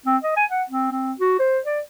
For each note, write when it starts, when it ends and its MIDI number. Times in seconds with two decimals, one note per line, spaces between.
0.06 0.17 60
0.23 0.35 75
0.37 0.45 80
0.50 0.63 78
0.70 0.90 60
0.91 1.13 60
1.20 1.37 66
1.40 1.59 72
1.65 1.80 74